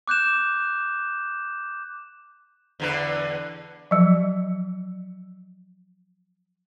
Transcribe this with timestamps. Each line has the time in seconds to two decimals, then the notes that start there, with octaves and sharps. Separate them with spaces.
0.07 D6 F#6 G6 E7
2.80 E2 D3 B4
3.91 F3 F#3